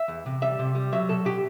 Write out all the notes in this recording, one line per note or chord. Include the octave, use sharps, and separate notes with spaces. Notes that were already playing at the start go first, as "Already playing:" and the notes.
Already playing: E5
E2
C3
G3 E5
C3
G3
F#3 E5
B2 A4
B2 G4